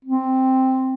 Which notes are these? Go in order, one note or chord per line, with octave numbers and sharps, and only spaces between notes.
C4